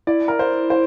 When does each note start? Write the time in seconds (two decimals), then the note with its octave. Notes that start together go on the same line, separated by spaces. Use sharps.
0.07 E4 D5
0.28 A#4
0.39 C5
0.70 C5